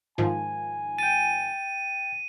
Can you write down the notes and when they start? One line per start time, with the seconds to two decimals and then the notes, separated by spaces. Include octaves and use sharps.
0.18 G#2 D#3 F3 G#5
0.99 G5 A6 D#7